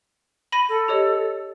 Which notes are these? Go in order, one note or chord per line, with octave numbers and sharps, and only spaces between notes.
B5 A#6 D#7
A4
G4 C#5 D#5